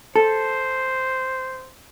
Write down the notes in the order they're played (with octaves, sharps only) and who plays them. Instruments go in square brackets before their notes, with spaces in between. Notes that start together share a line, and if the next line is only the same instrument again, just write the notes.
[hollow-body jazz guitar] A4 [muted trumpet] C5